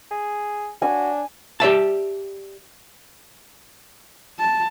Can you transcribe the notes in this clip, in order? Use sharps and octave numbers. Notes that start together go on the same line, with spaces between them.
G#4
D4 F#4 G#5
G4 D5 E5 A5
A5